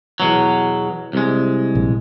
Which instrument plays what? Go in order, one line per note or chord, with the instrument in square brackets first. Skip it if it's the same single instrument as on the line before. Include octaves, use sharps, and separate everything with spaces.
[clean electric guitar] E2 B2 F#3
C2 G#3
[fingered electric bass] A#1